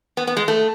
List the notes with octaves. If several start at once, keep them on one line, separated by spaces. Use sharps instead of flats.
B3
B3
G#3
A3